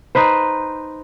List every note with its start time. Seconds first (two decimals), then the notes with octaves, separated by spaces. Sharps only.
0.15 D#4 B4 C5